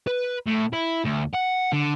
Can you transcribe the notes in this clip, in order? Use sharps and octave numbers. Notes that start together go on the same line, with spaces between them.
B4
A2
E4
D2
F#5
D3